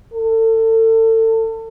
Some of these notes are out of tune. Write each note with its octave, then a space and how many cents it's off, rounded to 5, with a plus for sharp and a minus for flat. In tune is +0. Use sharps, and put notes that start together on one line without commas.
A4 +30